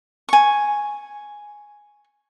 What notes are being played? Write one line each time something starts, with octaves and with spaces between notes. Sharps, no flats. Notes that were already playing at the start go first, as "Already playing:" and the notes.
G#5 C#6